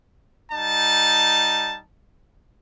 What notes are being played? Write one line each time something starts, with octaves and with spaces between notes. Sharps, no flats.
G3 D#4 A5